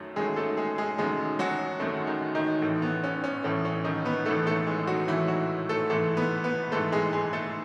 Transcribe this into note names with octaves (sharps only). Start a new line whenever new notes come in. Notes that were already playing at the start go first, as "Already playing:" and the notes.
Already playing: F#2 D#3 F#3 A3
F#2 D#3 F#3 G#3 A3 G#4
A3 A4
G#3 G#4
G#3 G#4
F#2 D#3 F#3 G#3 A3 G#4
F#3 F#4
F#2 D#3 F#3 A3
D#3 D#4
D#3 D#4
A1 A2 E3 A3
B3
C#4
C#4
A1 A2 E3 A3 C#4
C#4
D#3 D#4
B3 B4
A1 A2 E3 A3 A4
A3 A4
G#3 G#4
F#3 F#4
A1 A2 E3 A3 E4
F#3 F#4
A3 A4
A1 G#2 E3 G#3 A3 A4
B3 B4
B3 B4
A1 G#2 E3 G#3 A3 A4
G#3 G#4
G#3 G#4
A3 A4